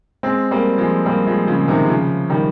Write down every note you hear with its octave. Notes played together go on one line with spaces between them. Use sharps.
G#3 C4
G3 A#3
F3 G#3
G3 A#3
F3 G#3
C#3 F3
C3 D#3
C#3 F3
D#3 G3